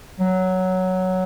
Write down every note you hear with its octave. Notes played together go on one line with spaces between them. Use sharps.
F#3